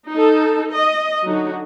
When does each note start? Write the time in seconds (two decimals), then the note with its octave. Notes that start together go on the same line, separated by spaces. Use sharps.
0.11 D#4 A4
0.71 D#5
1.25 D3 F#3 D#4 F#4